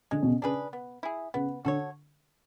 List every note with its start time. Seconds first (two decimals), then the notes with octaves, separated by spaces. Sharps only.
0.11 D3 G#3
0.23 B2
0.27 C#3
0.42 C#3 D4 G#4 B4
0.73 B3
1.03 E4 G#4
1.34 C#3 B3
1.65 D3 F#4 A4 C#5